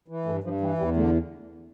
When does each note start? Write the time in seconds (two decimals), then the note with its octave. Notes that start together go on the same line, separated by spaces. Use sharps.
0.08 E3
0.25 G2 A3
0.44 G2 F3
0.61 E3 G3
0.78 E2 G3
0.96 D3 A3